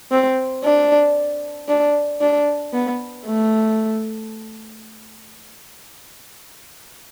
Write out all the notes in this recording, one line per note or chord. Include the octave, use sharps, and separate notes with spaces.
C4
D4
D4
D4
B3
A3